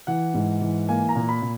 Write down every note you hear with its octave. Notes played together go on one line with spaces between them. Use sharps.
E3 F#5
G#2
E3
A#3 G#5
A#5
A#2
B5
A#2